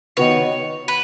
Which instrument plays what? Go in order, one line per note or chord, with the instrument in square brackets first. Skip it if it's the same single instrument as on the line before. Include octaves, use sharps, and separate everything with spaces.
[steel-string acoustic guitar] D#3 B3 F#4 B4 [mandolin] C#5
[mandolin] B4